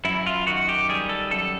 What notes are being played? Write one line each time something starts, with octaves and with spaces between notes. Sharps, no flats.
F#2 E4
F4
D#3 F#4
G4
G3 G#4
A4
F#2 A4